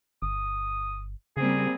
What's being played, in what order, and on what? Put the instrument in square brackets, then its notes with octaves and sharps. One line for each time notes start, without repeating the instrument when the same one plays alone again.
[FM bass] G1 [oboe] D#6
[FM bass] C#3 [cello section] G3 A#3 C4 [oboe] G#4